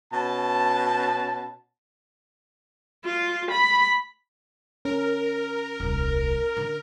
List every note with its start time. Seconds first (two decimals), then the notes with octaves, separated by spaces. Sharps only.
0.12 B2 C#4 A5
3.05 F4
3.52 B5
4.85 C#4 A#4
5.80 D#1 C2
6.57 D3